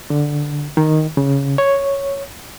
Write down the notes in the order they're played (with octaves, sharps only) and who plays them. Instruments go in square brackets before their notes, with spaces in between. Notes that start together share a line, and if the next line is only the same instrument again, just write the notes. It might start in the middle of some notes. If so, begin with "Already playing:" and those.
[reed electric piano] D3
D#3
C#3
C#5